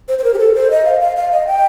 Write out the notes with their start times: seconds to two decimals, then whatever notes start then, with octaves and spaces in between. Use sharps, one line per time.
0.08 C5
0.18 C5
0.24 A#4
0.34 G4
0.39 A4
0.55 C5
0.70 D#5
0.85 F5
1.00 F5
1.16 F5
1.31 D#5
1.47 G5